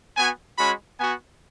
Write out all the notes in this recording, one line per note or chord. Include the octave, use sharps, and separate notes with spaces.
B3 F#4 G#5
G#3 C#4 F#4 B5
B3 F#4 G#5